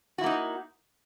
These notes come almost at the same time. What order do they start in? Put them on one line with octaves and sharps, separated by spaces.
F#4 E4 A#3 D#4